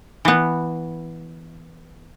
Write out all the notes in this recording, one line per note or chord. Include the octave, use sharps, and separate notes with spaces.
E3 B3